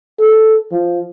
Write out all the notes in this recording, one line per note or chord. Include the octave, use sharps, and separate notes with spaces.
A4
F3